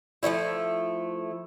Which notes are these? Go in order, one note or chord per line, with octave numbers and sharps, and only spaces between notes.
F3 A3 C#4 E4